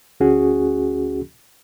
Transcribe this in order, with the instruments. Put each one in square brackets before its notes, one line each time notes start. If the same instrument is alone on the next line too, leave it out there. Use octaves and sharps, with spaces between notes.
[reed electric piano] D2 C#4 F#4 G#4